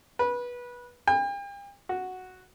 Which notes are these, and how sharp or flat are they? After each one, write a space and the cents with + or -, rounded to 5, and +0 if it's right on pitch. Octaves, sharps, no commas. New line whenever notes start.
B4 -20
G5 +40
F#4 +0